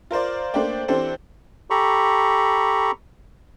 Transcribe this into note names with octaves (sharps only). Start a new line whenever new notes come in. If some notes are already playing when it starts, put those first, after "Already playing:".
F4 A#4 C5 D5
A3 A#3 D4 C5 D5 G5
E3 C4 D4 G4 A4 C5
G4 A4 A#5 B5 C#6